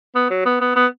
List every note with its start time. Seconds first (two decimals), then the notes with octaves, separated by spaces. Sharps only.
0.15 B3
0.30 F#3
0.45 B3
0.61 B3
0.76 B3